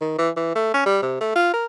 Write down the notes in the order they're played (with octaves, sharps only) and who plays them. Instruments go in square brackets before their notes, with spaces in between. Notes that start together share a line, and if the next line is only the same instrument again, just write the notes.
[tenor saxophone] D#3
E3
E3
A3
C#4
G3
C3
A3
F4
A#4